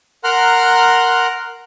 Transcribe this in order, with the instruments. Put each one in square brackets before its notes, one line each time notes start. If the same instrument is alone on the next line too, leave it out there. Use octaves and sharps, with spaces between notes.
[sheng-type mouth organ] A#4 F#5 A#5 C6 F6 F#6